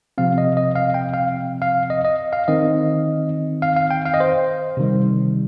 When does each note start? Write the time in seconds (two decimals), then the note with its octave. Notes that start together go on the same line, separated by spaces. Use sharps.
0.18 C3 F3 C4 F5
0.38 D#5
0.57 D#5
0.75 F5
0.94 G5
1.14 F5
1.62 F5
1.90 D#5
2.05 D#5
2.33 F5
2.48 D#3 C4 D#5
3.62 F5
3.76 F5
3.91 G5
4.06 F5
4.14 D#5
4.20 C5
4.77 C3 D#3 G3